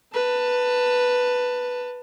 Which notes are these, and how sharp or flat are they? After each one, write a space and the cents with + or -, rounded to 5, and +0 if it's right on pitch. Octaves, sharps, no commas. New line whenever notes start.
B4 +0 A5 +20